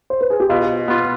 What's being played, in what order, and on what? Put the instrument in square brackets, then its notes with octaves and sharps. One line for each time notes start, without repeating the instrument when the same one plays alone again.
[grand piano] C5
B4
G#4
G4
[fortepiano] B2 [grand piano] F4
[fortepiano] B3 F4